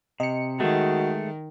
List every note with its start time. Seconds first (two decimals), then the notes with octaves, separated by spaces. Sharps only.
0.20 C3 D#5 C#7
0.60 D#3 G#3 A3 F#4